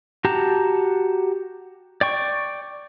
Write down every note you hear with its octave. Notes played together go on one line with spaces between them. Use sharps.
F#4 G4 A5 A#5
D5 G5 C#6